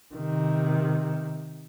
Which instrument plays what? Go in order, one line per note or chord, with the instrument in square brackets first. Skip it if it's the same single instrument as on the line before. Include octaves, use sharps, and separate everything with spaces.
[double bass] C3 D#3